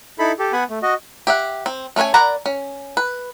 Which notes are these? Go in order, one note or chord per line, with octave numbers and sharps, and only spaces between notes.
D#4 E4 A4 B5
G4 A4
B3 F#5 G#5 B5
A3
F#4 D#5
G4 E5 F#5
C4
A3 C#4 B4 C#5 G#5
A#4 D5 F#5 A#5 B5
C#4
B4